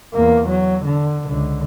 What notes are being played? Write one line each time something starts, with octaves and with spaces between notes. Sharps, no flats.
E2 A#3
F#3
D3
C#2 D3